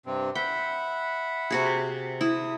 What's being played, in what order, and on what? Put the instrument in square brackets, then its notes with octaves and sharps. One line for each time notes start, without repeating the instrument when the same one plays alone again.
[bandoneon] G2 C3 C4
[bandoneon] E5 F#5 B5 [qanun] G5
[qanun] C3 F#4 G#4
[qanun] E4 [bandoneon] D#6